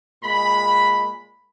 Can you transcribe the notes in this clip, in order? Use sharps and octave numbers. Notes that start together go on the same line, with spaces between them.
A#2 G#3 B5